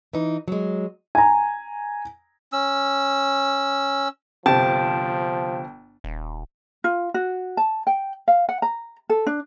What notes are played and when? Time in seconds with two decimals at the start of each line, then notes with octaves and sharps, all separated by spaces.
0.13 E3 D#4
0.48 F#3 G#3
1.15 G#5 A#5
2.53 C#4 E6
4.46 G1 C3 F3 G4 C5 G5 A5
6.04 D#1
6.84 F4
7.14 F#4
7.57 A5
7.87 G5
8.28 F5
8.49 F#5
8.62 A#5
9.10 A4
9.26 D4